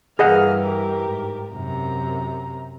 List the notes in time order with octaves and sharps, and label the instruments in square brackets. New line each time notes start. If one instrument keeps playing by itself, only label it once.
[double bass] G2 E3 [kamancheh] A#3 F6 [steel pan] G#4 D#5 F#5
[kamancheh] G4 A#4
[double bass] G#2
[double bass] F#2 C3 [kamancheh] A#5